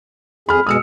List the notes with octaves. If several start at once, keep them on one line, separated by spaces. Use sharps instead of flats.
F2 G#4 B5 F6
B2 G#3 D#6 E6 C#7